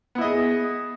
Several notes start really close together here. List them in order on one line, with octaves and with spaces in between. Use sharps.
B3 E4 D#5 G#4